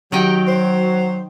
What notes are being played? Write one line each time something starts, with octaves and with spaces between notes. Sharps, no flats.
D#3 F#3 G4 D#5 G5
C5